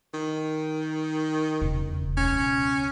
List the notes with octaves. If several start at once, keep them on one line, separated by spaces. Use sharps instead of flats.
D#3
E1 C#3
C#2 B2 C#4